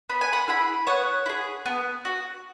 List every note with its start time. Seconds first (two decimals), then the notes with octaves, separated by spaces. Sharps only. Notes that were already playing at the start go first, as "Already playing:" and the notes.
0.09 B3 B5
0.21 G#5
0.33 F#5 B5
0.48 E4 G#4 F#5 B5
0.87 B3 C#5 F#5
1.26 E4
1.29 G#4
1.66 B3
2.05 F#4